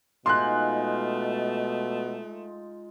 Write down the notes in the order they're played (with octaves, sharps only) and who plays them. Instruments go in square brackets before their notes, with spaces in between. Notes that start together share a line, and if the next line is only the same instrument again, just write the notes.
[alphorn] B2 [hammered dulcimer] G#3 D#4 F4 [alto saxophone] A3 [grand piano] C6 F#6